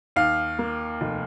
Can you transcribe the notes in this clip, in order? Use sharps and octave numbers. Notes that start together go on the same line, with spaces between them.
D#2 F5
A#3
F1